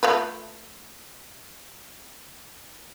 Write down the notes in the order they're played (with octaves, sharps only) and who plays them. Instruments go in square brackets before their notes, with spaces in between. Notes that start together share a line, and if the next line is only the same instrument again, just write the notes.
[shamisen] A3 F4 B4